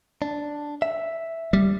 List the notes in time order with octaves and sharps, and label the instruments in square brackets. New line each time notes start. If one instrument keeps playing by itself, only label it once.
[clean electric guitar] D4
E5
[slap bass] G3